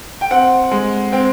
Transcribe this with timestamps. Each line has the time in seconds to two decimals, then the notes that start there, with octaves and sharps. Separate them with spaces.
0.21 G5
0.31 C4 F#5
0.71 G#3
1.12 C4 G5